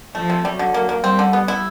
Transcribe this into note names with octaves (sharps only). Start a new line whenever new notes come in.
F3 A3
C3
F#3 G3
D3
A#3
A#3
G3 C4
D3
B3
E4